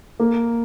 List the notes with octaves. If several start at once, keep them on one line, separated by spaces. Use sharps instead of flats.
A#3